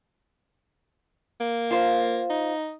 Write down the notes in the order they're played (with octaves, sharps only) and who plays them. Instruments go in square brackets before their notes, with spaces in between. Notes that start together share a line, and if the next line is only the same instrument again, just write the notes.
[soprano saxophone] A#3
[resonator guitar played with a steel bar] F4 C5
[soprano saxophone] D#4